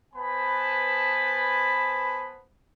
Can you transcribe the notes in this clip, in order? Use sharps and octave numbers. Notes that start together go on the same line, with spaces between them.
B3 B4 C5 G#5 A5 B5